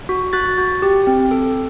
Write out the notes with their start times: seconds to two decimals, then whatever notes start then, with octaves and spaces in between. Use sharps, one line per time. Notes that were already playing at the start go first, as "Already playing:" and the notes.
0.09 F#4
0.33 F#4 F#6 A6
0.58 F#4
0.82 G4
1.07 C4
1.31 A4